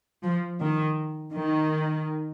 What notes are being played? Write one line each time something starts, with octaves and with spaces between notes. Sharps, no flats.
F3
D#3
D#3